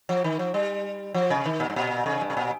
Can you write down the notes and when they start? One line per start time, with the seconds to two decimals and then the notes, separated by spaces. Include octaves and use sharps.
0.09 F3
0.24 D#3
0.39 F3
0.54 G3
1.14 F3
1.30 C3
1.46 D#3
1.60 A#2
1.70 G2
1.76 A#2
2.06 C3
2.21 G2
2.30 C3
2.37 A#2